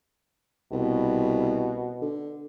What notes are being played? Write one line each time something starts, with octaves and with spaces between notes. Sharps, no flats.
C2 B2
D3